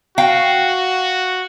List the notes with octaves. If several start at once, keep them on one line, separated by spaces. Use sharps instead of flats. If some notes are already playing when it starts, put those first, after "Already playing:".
F#4 F5 G5